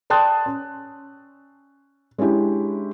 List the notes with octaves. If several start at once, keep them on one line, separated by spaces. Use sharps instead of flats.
D5 G5 A5 C6 D#6 F#6
C#4
G#3 C#4 D4 E4 G4